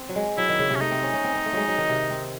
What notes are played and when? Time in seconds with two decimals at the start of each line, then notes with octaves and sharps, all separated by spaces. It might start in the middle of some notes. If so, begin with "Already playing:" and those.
Already playing: C4
0.09 F#3
0.16 G#3
0.38 F#3 E4
0.49 D#3
0.59 C#3
0.70 C3
0.75 C#4
0.80 A3 D#4
0.91 C4
1.03 C#4
1.13 C#4
1.24 C4
1.35 C4
1.46 A3
1.53 F#3 G#3
1.68 F#3
1.78 D#3
1.89 C3
2.10 C4